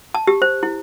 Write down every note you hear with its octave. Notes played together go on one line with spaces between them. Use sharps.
A5
G4
C5
E4